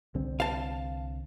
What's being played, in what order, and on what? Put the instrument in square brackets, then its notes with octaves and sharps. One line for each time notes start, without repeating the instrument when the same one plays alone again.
[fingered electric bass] C2 D3 C4
[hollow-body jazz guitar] F5 A5